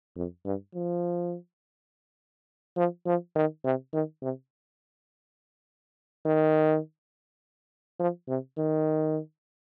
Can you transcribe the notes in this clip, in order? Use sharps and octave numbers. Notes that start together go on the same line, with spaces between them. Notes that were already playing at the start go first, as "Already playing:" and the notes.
F2
G2
F3
F3
F3
D#3
C3
D#3
C3
D#3
F3
C3
D#3